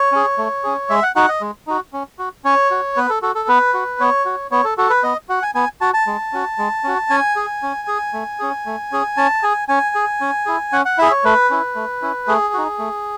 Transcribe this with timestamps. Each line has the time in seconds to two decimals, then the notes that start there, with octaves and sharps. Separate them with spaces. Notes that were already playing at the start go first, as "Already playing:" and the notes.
Already playing: C#5
0.12 C#4 G#4
0.38 A3
0.64 C#4 G#4
0.90 G#3 E5
1.03 F#5
1.16 D#4 F#4 F#5
1.29 D#5
1.41 G#3
1.67 D#4 F#4
1.93 C#4
2.19 F#4
2.45 C#4 C#5
2.71 F#4
2.97 B3 B4
3.10 A4
3.22 F#4 A4
3.35 A4
3.48 B3 B4
3.74 F#4
4.00 B3 C#5
4.26 F#4
4.51 B3 C#5
4.64 A4
4.78 F#4 A4
4.90 B4
5.03 B3 D#5
5.29 F#4 F#5
5.42 G#5
5.55 B3 G#5
5.81 F#4 A5
5.94 A5
6.07 G#3
6.33 C#4 F#4
6.58 G#3
6.84 C#4 F#4
7.10 C#4 G#5
7.36 G#4
7.63 C#4
7.88 G#4
8.14 A3
8.40 C#4 G#4
8.66 A3
8.92 C#4 G#4
9.17 C#4 A5
9.43 G#4 G#5
9.68 C#4 G#5
9.95 G#4
10.21 C#4
10.46 E4 G#4
10.73 C#4 F#5
10.85 F#5
10.98 E4 G#4 E5
11.11 C#5
11.24 A3 B4
11.50 C#4 E4
11.75 A3
12.02 C#4 E4
12.28 A3 G#4
12.54 D#4 F#4
12.79 A3